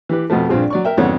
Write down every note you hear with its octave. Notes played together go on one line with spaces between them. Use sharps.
E3 G4 B4
F2 B2 F3 A3
A#1 G2 C4 F4 G#4
F#3 D5 C#6
A#4 E5 G5
F2 G#2 D3 B3 C#5